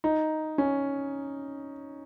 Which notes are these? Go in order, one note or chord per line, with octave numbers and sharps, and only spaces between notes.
D#4
C#4